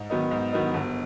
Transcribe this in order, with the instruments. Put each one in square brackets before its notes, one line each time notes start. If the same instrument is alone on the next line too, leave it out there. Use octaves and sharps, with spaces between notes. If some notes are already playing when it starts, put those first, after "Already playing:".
Already playing: [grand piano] G#2
D#3 F#3 B3 D#4
G#2
D#3 F#3 B3 D#4
G1